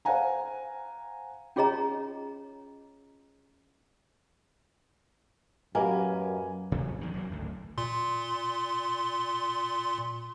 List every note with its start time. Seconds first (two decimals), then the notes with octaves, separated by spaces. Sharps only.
0.05 C5 F5 F#5 G#5 A#5
1.56 C#4 F4 G#4 C#5 D#5 A#5
5.75 F#2 A#3 F#4 G4 B4 D#5 G#5
6.71 D1 C3 F3 F#3
7.01 E2 D#3
7.14 F#2 A#2 F#3
7.31 G#1 D2 A2
7.78 A#2 C6